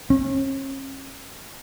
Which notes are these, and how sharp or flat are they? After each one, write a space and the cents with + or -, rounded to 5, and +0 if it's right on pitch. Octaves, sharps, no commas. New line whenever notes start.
C#4 -35